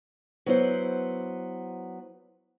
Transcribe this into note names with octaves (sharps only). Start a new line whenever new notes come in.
F#3 B3 E4 C5